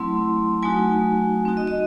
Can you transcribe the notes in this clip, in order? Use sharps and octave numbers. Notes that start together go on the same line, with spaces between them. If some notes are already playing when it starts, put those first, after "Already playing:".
Already playing: F#3 A3 C4 E4 C6
F#3 A3 D#4 F#4 G#5
C4 D#4 F#4
D#5
D#5